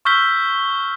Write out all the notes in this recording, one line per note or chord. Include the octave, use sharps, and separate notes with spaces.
C#6 E6 F6 G6 B6 G7